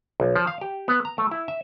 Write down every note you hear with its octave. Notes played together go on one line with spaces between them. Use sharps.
B1
F3
F5
G4
B3
A#5
A3
E4
E5